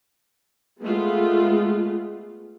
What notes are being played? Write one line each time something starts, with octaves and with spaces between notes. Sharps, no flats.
G#3 A3 B3 F4